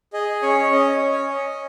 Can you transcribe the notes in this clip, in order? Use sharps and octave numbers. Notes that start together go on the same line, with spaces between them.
G#4 D#5
C#4 C#5
C#4 D#5
C#5
C#4
C#5
C#4 D#5